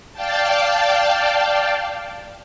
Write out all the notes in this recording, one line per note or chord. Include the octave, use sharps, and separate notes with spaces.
D5 F5 G5 A5